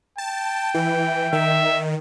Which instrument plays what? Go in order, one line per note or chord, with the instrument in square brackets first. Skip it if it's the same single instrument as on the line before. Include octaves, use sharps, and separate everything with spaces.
[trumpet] G5 [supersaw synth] A5
[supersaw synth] E3
[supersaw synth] D#3 [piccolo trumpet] E5